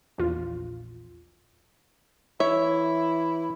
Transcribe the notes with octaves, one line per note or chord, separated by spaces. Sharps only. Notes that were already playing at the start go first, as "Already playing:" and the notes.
A#1 E2 F4
E3 E4 C#5 E5